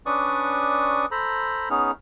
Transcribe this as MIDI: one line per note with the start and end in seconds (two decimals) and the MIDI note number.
0.06 1.06 61
0.06 1.06 62
0.06 1.06 71
0.06 1.06 74
0.06 1.06 85
0.06 1.06 87
1.11 1.69 69
1.11 1.69 72
1.11 1.69 82
1.11 1.69 83
1.70 1.91 59
1.70 1.91 61
1.70 1.91 63
1.70 1.91 68
1.70 1.91 89